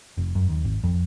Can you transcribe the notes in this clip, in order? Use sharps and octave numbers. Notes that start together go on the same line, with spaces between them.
F1
F#2
D#2
G#1
F2